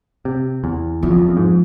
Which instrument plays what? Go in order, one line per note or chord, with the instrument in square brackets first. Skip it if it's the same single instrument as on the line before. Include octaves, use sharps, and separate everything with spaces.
[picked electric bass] C3
E2
[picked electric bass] E2 [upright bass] F3
[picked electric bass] F2
E2
F2
G#2